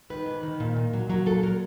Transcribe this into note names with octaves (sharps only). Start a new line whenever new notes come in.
D#3 B4
G#2
D#3
A#2
A#2
F#3
F#3 A#4
A#2 A4
F#3 A#4